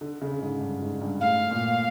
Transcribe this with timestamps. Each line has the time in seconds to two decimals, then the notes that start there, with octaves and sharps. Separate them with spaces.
0.01 D3
0.21 C#3
0.42 G#2
0.61 G2
0.81 G#2
1.01 G2
1.21 A2 F5
1.51 A#2